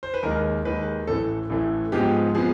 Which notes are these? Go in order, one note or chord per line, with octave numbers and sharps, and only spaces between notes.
C5
B4
D#2 D#3 G#3 A#4
D#2 D#3 G#3 B4
A1 A2 E3 A3 A4
A1 A2 E3 A3
G#2 F3 G#3 B3 G4
F3 G#3 B3 G#4